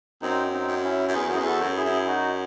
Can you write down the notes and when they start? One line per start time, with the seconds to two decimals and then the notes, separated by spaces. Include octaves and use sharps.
0.22 F#2 C4 D#4
0.53 C4 D#4
0.68 F#2
0.84 C#4 E4
1.08 F#2
1.14 E2 G#4
1.25 F#2 F#4
1.35 E4 G#4
1.38 E2
1.45 F#4 A4
1.60 F#2
1.76 E4 G#4
1.85 F#2
2.07 D#4 F#4